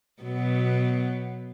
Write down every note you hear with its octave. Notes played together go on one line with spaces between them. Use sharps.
B2 F#3 B3